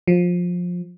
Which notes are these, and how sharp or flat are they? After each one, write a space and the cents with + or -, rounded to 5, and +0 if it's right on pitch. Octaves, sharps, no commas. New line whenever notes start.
F3 +20